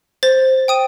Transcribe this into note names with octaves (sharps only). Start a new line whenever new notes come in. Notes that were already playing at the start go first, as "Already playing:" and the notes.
C5 A6
G5 D#6 D#7